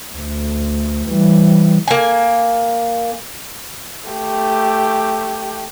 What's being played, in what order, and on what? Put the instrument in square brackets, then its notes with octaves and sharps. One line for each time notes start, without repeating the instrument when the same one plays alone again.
[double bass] D2
E3 G3
[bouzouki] A#3 G#5
[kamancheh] A3 G4